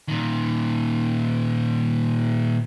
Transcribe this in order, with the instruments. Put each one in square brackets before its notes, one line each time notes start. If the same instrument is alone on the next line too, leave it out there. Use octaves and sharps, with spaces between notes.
[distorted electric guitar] A#2 D#3